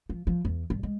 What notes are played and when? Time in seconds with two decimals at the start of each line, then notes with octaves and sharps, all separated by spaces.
0.09 F3
0.27 F3
0.45 E2
0.70 G2
0.83 G#3